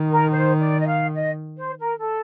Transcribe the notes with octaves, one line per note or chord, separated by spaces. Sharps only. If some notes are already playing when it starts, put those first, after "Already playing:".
Already playing: D#3
A#4
C5
D5
D#5
F5
D#5
C5
A#4
A4